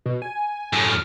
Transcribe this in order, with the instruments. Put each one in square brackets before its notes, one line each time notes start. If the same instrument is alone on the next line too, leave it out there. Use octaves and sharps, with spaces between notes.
[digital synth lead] B2
G#5
[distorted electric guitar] F#2 A2
[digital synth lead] F6